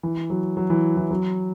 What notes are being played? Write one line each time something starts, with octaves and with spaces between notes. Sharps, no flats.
E3
F#3
F#3
E3
E3
F#3